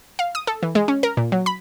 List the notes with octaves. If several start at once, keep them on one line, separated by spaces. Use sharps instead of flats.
F5
D#6
A4
E3
G#3
C#4
A#4
A#2
F#3
B5